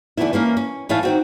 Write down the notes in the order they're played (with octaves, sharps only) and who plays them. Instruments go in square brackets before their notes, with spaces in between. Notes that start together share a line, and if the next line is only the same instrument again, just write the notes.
[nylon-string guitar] D3 E3 G#3 A3 B3 E4
E3 A#3 C#4 A#4
C#4
A2 E3 A3 C#5 F5 A5
D#3 C4 F#4